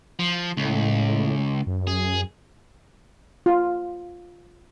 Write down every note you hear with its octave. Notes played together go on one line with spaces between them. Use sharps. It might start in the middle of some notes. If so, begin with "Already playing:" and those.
F3
C#2 A2
F#2
G#4
F4